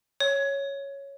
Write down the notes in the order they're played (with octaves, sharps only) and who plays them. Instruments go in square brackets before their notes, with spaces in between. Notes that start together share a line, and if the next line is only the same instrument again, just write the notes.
[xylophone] C#5